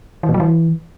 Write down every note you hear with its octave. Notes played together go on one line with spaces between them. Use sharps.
E3
A#2
F#3
E3